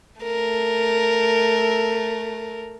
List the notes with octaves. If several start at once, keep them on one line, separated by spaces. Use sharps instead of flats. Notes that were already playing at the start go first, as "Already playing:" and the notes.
A3 A#4